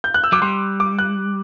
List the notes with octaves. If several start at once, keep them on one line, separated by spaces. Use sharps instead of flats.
G6
F#6
E6
F#3 D6
G3 C6
D6
F#6